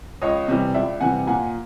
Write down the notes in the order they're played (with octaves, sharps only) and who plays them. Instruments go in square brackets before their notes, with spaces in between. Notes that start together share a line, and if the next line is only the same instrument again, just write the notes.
[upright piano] C#2 C#5 D#5
C3 E3 G3
C#2 D5 E5
C3 E3 G3 F#5 G#5
A#2 F#5 G#5